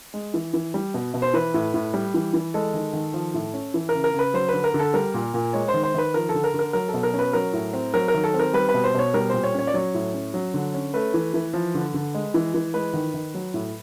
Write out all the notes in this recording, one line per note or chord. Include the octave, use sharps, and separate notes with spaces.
G#3
E3
E3
G3
B2
B2
C5
E3 B4
A2
A2
G3
E3
E3
G#3 A4
D#3
D#3
F3
A2
C#4
E3
A#4
C#3
A#4
C#3 B4
F#3 C5
B4
D3
A#4
D3
A4
G3 A#4
A#2
A#2
G#3 C#5
C5
D#3
C5
D#3 B4
F3 A#4
A4
D3
A#4
D3
A#4
F#3 A#4
A4
B2
A#4
C#4
B4
F#3 A#4
A2
C4
F#3 A#4
A#4
D#3
A4
C4
A#4
G3 B4
B4
B2
C5
B2 C#5
G3 A#4
A#2 C5
C#5
C#4 C#5
D5
F#3 C#5
A2
C#4
F#3
D3
C#4
A3 B4
E3
E3
F3
D3
D3
G#3
E3
E3
G#3 B4
D#3
D#3
F#3
A2